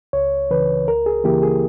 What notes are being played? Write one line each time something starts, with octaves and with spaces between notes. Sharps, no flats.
C#2 C#5
C#3 E3 B4
C#2 A#4
G#4
C#3 E3 A#3 E4 G4
G#4